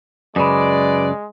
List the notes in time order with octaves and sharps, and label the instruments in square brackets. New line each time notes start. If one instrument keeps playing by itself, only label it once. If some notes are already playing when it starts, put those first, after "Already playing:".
[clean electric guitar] F#2 C#3 [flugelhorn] G#3 [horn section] B4 D5 [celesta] B5 D#6